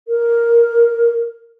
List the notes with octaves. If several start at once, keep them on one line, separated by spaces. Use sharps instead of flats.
A#4